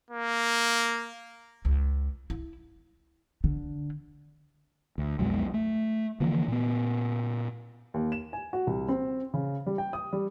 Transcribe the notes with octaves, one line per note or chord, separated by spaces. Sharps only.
A#3
C#2
E4
D3
D2
B1 F2 B2 G#3
A3
D3 E3 F3 A#3
A#2 B3
D#2
E7
G#5
F#4
C2
C4
C#3
G3
G5
D#6
G3